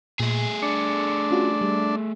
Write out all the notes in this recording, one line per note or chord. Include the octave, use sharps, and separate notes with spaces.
A#2 A3 G#4
D4 C#7
C#4 F4 F#4
G3